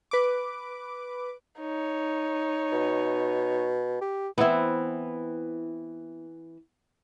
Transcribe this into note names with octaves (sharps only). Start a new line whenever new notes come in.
B4 D6
D#4 C#5
B2
G4
E3 B3 C4 E4